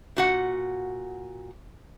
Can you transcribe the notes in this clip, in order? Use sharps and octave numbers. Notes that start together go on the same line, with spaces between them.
A#2 F#4 F#5